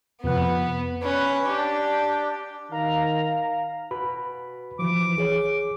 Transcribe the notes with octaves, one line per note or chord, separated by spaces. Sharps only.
F2 C3 B3 F#5
C#4 B4
D4 G4
D#3 F5 A#5
F#4 B4 B5
E3 F3 D6
B1 G#4 C#5